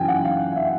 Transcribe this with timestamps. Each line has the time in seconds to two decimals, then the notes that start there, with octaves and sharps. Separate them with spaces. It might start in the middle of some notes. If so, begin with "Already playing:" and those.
Already playing: F#2 C#3 E3 G5 G#5
0.08 F#5
0.25 F5
0.52 F5
0.56 E5